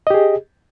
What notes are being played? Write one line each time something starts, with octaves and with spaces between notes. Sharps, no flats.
G4 G#4 D#5